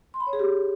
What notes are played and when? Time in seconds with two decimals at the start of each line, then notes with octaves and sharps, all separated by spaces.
0.14 C6
0.20 B5
0.27 C#5
0.33 G#4
0.39 G4